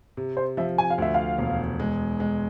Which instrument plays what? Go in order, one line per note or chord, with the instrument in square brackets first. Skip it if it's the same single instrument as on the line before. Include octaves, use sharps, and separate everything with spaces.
[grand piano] C3
[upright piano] C5
[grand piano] F3 [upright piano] E5
[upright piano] G#5
F5
[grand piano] D2 [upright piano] E5
[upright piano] F5
[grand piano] E1
G#3
G#3